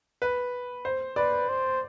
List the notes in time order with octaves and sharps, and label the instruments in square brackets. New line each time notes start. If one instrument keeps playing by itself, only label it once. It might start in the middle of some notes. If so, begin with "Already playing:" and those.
[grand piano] B4
C5
[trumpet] B4 [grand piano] D5
[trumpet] C5